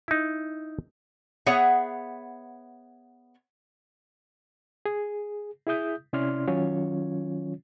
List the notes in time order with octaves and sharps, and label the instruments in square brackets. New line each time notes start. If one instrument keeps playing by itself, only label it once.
[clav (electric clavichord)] D#4 E4
[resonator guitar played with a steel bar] B3 G#4 C#5 E5 F#5
[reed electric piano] G#4
E4 G#4 E5 D#6 G6
C3 C#4 E4 D5 C6 F6
D#3 F#3 C#4 F4 C#5